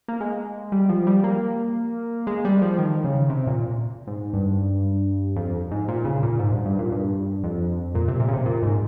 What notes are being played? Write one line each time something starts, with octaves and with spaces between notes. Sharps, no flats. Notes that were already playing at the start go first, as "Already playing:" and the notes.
A#3
G#3
G3
F3
G3
A#3
G#3
G3
F3
D#3
C#3
C3
A#2
G#2
G2
F2
G#2
A#2
C#3
A#2
G#2
G2
G2
A#2
G2
F2
A#2
C3
A#2
C#3
C3
A#2
G#2